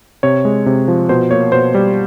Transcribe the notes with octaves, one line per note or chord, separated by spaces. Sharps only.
C3 C#5
G#3
C3
F3
B2 C5
A#3 C#5
B2 C5
G3